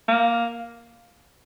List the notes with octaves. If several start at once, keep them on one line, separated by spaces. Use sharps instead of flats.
A#3